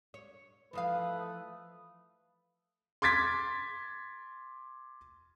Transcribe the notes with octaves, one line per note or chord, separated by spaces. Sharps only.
C#5
E3 F3 A3 B4 F5 D#6
C6 D6 G#6 A6 B6